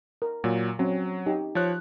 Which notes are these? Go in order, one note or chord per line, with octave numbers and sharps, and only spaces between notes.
A#4
A#2 F#3
F#3 C4 C#4
D#4 G4
F3 C#5 F#6